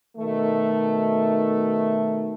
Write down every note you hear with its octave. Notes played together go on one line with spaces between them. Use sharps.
B2 D#3 A3